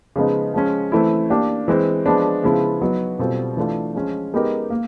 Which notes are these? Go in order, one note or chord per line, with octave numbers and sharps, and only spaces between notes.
C#3 F3 G#3 B3 D#4
F3 G#3 C#4
E3 A3 C4 E4
A#3 D4 G4
E3 G#3 C4
F3 G#3 B3 D4
C#3 F3 G#3 B3 E4
F#3 B3 D#4 F#4
B2 G3 C4 F4 A4
E3 A3 D4 F4
F3 G#3 C#4
G#3 B3 D#4 G4 A#4
A#3